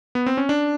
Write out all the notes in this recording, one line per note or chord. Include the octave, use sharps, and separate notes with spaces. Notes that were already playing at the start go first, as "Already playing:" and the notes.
B3
C4
C#4
D4